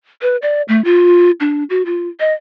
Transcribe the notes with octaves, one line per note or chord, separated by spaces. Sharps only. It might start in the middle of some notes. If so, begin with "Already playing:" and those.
B4
D5
A3
F4
D4
F#4
F4
D#5